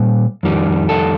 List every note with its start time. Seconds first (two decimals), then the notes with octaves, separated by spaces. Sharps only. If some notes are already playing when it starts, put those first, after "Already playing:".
Already playing: A#2 G3
0.43 F2 D#3 G3
0.89 A4